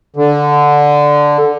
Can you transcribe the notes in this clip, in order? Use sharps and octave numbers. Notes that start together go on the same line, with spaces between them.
D3